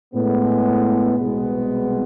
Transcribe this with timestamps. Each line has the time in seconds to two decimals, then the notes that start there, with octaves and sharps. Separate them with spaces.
0.14 A2 G#3 B3
1.17 C2 B2 G#3 B3